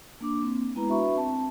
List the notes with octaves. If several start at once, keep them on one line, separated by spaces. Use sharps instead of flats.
A#3 D4 D6
A#3 C4
G#3 B3 E4 B4 A#5
D4 F#4 B4 E5 B5 C#6
C4 A5